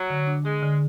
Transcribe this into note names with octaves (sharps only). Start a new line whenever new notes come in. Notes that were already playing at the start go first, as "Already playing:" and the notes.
Already playing: F#3
D3
D4
G#3 G#4
D3